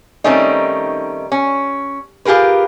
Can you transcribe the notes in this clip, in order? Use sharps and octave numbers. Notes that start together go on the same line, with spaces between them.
D#3 G3 A3 C4 C#4 D#4
C#4
F4 G4 G#4 A#4 B4